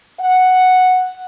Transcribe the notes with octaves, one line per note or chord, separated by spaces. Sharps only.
F#5